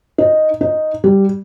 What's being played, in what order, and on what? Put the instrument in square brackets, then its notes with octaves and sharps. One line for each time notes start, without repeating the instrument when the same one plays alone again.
[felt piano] D#4
D#4
G3